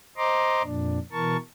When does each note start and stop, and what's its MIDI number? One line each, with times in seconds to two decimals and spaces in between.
0.17 0.62 72
0.17 0.62 75
0.17 0.62 82
0.17 0.62 84
0.17 0.62 86
0.62 0.99 41
0.62 0.99 46
0.62 0.99 62
1.12 1.37 47
1.12 1.37 52
1.12 1.37 70
1.12 1.37 81
1.12 1.37 85